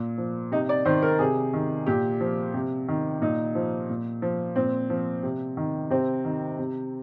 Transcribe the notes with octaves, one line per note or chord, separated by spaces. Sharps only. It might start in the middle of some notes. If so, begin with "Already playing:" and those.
Already playing: A#2
F3
C3 D#4
D5
D#3 C5
A#4
C3 G#4
D#3
A#2 G4
F3
C3
D#3
A#2 D#4
F3
A#2
F3
A#2 C4
F3
C3
D#3
C3 C4
D#3
C3